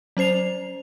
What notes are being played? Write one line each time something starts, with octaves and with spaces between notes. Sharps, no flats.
F#3 C#4 C5 C7 F7